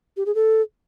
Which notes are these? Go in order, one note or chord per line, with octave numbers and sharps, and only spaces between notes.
G4
G#4
A4